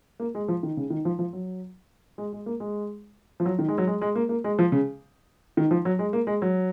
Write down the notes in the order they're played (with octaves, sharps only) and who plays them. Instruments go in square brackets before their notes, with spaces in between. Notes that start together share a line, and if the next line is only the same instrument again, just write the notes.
[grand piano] A#3
G#3
F3
D#3
C#3
D#3
F3
F3
F#3
G#3
G#3
A#3
G#3
F3
F#3
D#3
G#3
F#3
G#3
G#3
A#3
A#3
G#3
F3
C#3
D#3
F3
F#3
G#3
A#3
G#3
F#3